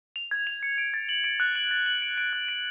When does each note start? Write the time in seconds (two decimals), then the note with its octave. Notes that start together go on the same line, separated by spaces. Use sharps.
0.16 F7
0.31 G#6
0.47 F7
0.63 C#7
0.78 D7
0.94 A6
1.09 F#7
1.24 D7
1.40 F#6
1.56 F#7
1.71 A6
1.86 F#7
2.02 D7
2.18 D7
2.33 F#6
2.49 D7